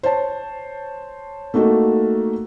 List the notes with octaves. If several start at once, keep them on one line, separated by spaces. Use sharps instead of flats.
C5 C#5 A5
A3 A#3 D#4 F#4 A4